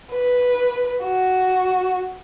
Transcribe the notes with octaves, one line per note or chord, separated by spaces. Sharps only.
B4
F#4